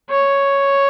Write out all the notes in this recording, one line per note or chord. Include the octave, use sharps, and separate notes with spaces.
C#5